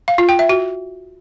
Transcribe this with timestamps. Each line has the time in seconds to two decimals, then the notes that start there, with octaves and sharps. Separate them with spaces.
0.08 F5
0.18 F4
0.29 G5
0.39 E5
0.49 F#4